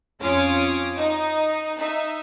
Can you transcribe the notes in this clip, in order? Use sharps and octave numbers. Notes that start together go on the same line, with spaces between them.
F2 C#4 F4 C#5 D6 D#6
D#4
D#4 E5